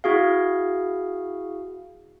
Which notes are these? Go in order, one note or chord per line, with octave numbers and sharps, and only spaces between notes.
E4 F#4 G#4 F5